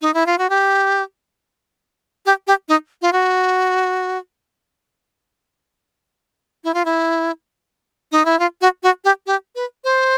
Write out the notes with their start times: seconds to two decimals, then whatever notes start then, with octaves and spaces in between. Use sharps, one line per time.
0.02 D#4
0.14 E4
0.26 F4
0.38 F#4
0.50 G4
2.26 G4
2.47 G4
2.68 D#4
3.02 F4
3.13 F#4
6.64 E4
6.74 F4
6.85 E4
8.12 D#4
8.25 E4
8.39 F4
8.61 F#4
8.83 F#4
9.04 G4
9.26 G4
9.55 B4
9.84 C5